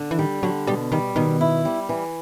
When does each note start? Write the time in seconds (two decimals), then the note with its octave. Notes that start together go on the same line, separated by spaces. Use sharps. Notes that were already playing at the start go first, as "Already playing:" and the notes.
Already playing: D3
0.11 E3
0.18 D#3 G3
0.43 D3 F#3
0.67 B2 G3
0.92 D#3 G3
1.16 B2 D#3
1.41 E4
1.65 G3
1.89 E3